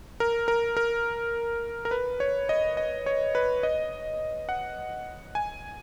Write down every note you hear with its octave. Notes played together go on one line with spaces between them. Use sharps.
A#4
A#4
A#4
A#4
B4
C#5
D#5
D#5
C#5
B4
D#5
F#5
G#5